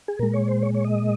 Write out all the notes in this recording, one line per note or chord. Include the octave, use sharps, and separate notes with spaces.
G#4
A#2 G#3 A#4
C#5
C5
C#5
C#5
D#5